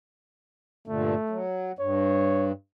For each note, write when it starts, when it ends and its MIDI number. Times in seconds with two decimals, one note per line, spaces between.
0.88 1.15 43
0.88 1.15 46
0.88 1.15 50
0.88 1.44 57
1.30 1.72 54
1.79 2.52 43
1.79 2.50 73